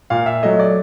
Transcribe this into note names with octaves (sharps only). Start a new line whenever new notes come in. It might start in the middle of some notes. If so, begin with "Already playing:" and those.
A#2 F5
E5
F#3 A3 D#5
D5